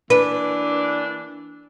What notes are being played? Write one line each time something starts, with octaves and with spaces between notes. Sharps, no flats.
E3 A#3 D4 B4